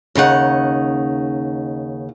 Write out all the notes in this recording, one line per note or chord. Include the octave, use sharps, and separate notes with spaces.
D#2 C#3 D#4 F#5